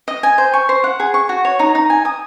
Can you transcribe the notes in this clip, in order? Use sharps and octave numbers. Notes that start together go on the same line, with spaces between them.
D#5
G#5
C5
C#6
C5
F#5
G#4
C#6
F#4
C#5
D#4
D#4
G#5
D#6